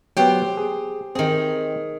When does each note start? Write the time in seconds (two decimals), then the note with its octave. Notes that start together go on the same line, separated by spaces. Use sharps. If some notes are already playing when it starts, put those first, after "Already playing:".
0.17 F#3 B3 G4 C5 G5
0.57 G#4
1.15 D#3 C4 G#4